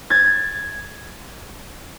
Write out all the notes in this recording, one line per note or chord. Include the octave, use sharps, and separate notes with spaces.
G#6 A6